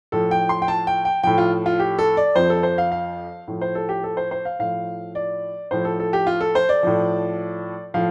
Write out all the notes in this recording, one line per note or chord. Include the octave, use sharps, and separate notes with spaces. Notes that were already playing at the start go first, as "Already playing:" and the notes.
A2 F3 A4
G5
C6
G5
A5
G5
G5
A2 F3 G5
F4
F4
G4
A4
D5
F2 F3 C5
A4
C5
F5
F5
A2 F3
C5
A4
G4
A4
C5
C5
F5
A2 F3 F5
D5
A2 F3 C5
A4
A4
G4
F4
A4
C5
D5
A2 F3
A2 F3 F5